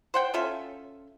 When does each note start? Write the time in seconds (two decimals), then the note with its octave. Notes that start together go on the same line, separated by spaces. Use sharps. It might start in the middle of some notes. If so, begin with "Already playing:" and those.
0.14 C5 F#5 G5
0.34 C#4 F4 A4 E5